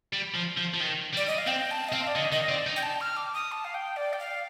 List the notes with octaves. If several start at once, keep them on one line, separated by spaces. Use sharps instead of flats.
G3
F3
F3
F3
D#3
G3 D5
D#5
F5
C4 G5
A5
D#5
C4 F5
D5
D3 D#5
D#3 D#5
C4 D5
D#4
G5
A5
F6
D6
D#6
A5
F5
G5
D5
G5
F5